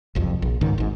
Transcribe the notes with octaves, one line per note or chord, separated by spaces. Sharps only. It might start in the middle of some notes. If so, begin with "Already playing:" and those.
F#1 C2 F2
A#1
C#2 G#2 D#3
G#1 G#2